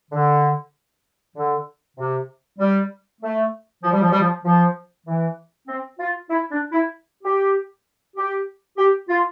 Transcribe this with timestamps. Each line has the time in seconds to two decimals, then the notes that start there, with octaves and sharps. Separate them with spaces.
0.11 D3
1.36 D3
1.97 C3
2.59 G3
3.21 A3
3.83 F3
3.92 G3
4.01 F3
4.11 G3
4.20 F3
4.45 F3
5.07 E3
5.68 C4
6.00 F4
6.30 E4
6.51 D4
6.72 E4
7.24 G4
8.16 G4
8.78 G4
9.09 F4